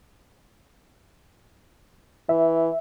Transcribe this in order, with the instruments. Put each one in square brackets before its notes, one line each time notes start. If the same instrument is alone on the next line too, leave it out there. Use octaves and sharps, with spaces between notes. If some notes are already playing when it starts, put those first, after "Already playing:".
[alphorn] E3 [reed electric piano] E5